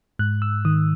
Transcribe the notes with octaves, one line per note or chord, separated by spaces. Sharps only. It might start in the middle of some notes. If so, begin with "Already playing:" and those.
G#2 F#6
E6
D#3 D#6